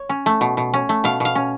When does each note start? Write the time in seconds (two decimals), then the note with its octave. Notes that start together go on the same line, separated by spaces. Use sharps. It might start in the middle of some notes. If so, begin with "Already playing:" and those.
Already playing: C#5
0.09 C#4
0.26 A3
0.41 B2
0.57 B2
0.74 C#4
0.89 A3
1.04 B2 F5
1.20 B2 F5
1.35 C#4